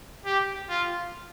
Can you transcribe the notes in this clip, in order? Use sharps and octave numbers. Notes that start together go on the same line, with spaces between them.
G4
F4